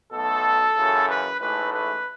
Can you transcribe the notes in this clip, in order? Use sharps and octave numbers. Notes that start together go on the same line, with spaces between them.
B1 B2 A3 A4
F#2 C#3 E3
B4
A1 G#2 E3 A3 B4
B4